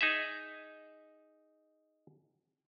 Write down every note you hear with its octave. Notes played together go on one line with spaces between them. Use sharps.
D#4 G#4 E5